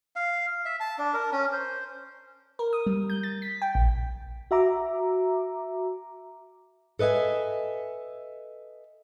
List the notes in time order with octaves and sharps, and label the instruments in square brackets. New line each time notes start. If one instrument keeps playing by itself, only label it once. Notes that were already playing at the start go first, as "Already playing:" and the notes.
[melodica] F5
E5
A5
D4
A#4
C#4
C5
[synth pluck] A#4
D#6
G3
G6
A6
B6
G5
A#1
[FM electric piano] F#4 E5 A#5 D6
[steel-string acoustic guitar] A4 B4 D#5 E5 G#5